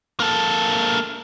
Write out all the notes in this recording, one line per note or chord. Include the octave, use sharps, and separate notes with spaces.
A#3 A4